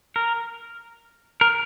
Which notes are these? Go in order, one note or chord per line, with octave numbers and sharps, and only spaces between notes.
A#4
A#4